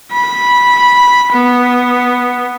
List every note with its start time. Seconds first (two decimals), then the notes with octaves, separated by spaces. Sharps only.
0.12 B5
1.32 B3